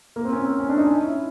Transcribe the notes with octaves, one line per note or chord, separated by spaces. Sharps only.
A#3
C4
C#4
C4
C#4
D4
D#4
C#4
E4